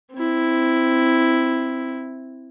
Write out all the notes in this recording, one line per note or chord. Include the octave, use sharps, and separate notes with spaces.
C4 E4